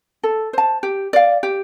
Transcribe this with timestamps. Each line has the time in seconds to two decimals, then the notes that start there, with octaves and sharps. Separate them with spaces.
0.24 A4
0.53 C5 A5
0.83 G4
1.13 D5 F5
1.43 G4